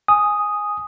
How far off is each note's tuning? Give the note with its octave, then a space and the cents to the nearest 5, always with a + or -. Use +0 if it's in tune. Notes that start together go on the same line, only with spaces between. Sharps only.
G#5 +0 D#6 +0